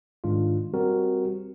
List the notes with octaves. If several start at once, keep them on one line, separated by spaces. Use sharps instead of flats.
G#2 D#3 G#3 D4 F4
G3 C4 F#4 G4 A#4